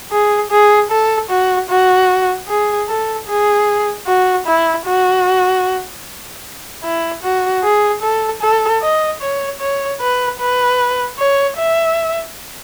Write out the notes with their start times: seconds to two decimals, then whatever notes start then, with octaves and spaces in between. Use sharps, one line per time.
0.12 G#4
0.51 G#4
0.91 A4
1.30 F#4
1.70 F#4
2.48 G#4
2.89 A4
3.27 G#4
4.07 F#4
4.47 E4
4.87 F#4
6.84 E4
7.23 F#4
7.63 G#4
8.02 A4
8.41 A4
8.81 D#5
9.21 C#5
9.60 C#5
10.00 B4
10.40 B4
11.19 C#5
11.57 E5